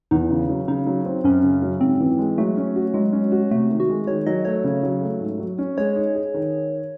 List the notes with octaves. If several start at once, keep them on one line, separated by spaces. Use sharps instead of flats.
E2 D#4
C#3
F#3
C#3 D#4
F#3
C4
F#2 C#4
C#3
F#3
G#2 C4
E3
G#3
F#3 A3
C#4
F#4
F#3 G#3
C#4
F#4
C3 A3
D#3
F#4
G#3
D#3 C#5
F#3 D#5
A3 C#5
C#3
F#3
A3
G#2
F#3
C#4
G#3 C#5
D#4
G#4
D#3